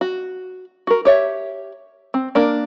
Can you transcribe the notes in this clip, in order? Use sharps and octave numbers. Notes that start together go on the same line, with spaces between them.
F#4
F#4 A#4
G4 C#5 E5
C4
A#3 D4 A#4